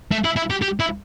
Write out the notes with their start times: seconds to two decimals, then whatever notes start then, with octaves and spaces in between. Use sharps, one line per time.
0.12 A3
0.25 E4
0.36 E4
0.50 G4
0.62 G4
0.80 E4